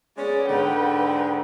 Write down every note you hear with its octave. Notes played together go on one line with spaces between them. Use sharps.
G#3 B3 C#4 G#4 D5
G#2 D3 B4 G5